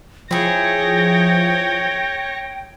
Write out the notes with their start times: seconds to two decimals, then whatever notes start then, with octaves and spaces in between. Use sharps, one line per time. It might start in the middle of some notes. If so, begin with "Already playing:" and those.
0.31 F3 E4 G#4 C#5 G5 A#6